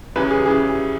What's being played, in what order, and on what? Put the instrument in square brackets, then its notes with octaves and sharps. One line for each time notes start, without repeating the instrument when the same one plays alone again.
[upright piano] E2 C#3 E3 G3 [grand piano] B4
[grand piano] G#4
[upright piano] C#3 E3 G3 [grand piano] G#4